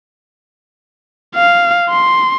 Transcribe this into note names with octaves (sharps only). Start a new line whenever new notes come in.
F5
C6